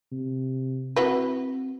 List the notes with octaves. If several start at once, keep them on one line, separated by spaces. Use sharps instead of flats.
C3
C4 E4 F#4 B4